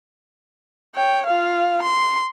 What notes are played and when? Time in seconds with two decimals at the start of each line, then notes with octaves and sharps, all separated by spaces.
0.95 C#5 G5
1.26 F4 F5
1.82 C6